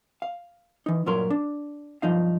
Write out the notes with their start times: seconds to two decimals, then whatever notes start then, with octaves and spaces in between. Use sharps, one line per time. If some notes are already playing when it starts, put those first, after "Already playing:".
0.22 F5
0.86 E3 D#4
1.06 G2 A#2 F#3 A#4 C6
1.30 D4
2.02 B1 G2 F3 D#4 F5